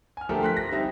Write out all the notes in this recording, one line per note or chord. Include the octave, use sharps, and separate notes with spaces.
G#5 F6
D3 F3 A3 G4 A4 A#4
C6 F#6 B6
A#6
G3 C4 D#4 E5